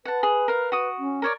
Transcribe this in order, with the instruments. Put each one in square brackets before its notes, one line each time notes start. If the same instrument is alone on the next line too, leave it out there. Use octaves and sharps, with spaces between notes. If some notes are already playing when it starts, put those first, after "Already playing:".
[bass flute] B4 [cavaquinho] F#5 A5
[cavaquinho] G#4
A#4 F5
F#4 D#6
[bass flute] C#4
[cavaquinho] A#4 C#5 D5